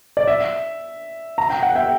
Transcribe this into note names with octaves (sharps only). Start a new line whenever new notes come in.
D5
E5
A#5
G5
F#5
E5 G5